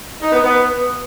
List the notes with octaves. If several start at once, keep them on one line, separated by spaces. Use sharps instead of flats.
D#4
B3
B3